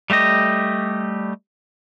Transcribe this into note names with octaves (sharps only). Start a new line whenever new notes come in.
G3 A3 G4 D#5